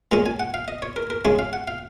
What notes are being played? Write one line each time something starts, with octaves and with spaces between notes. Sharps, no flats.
A#2 G#3 C#4 A#5
G#5
F#5
F5
D#5
C#5
A#4
A#4
C#3 G#3 C#4 G#4
F5
F#5
F5